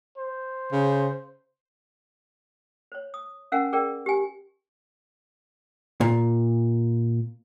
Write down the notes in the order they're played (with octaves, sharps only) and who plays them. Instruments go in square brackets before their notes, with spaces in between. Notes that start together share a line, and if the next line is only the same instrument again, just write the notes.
[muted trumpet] C5
[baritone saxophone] C#3
[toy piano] C5 C#5
D#6
C#4 A#4 F5 F#5 G#5
G#4 A#4 D5 G5
G4 G#5
[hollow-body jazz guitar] A#2